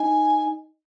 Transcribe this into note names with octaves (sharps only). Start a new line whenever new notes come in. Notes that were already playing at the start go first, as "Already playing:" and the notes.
Already playing: D#4 G#5